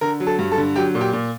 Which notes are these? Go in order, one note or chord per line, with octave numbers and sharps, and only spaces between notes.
D3 A#4
F#3
A4
G2
A4
D3
F#3 G4
A#2
G4
A#2